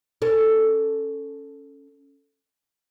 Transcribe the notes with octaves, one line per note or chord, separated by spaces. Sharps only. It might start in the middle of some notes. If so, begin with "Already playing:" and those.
C#4 A4